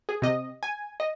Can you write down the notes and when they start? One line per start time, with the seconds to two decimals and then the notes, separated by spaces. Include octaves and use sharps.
0.09 G#4
0.22 C3 D#5
0.63 G#5
1.00 D#5